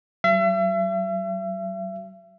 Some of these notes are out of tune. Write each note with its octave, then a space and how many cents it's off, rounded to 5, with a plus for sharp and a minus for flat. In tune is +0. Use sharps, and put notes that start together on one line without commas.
F#3 +40 E5 +40